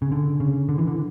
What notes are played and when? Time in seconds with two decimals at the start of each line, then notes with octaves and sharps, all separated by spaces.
0.02 C#3
0.12 D3
0.40 C#3
0.69 D3
0.78 E3
0.88 D3